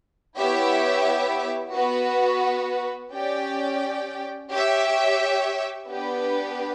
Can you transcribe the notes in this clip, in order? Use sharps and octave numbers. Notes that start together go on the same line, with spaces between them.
B3 E4 G4 C#5 E5
B3 F#4 B4
C#4 G4 D5 G5
G4 C#5 E5
B3 D4 G4 B4